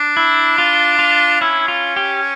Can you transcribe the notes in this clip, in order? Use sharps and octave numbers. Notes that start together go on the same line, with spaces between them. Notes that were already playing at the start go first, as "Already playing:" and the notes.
Already playing: D4
E4
F4
F4
C#4 E4
F4
G4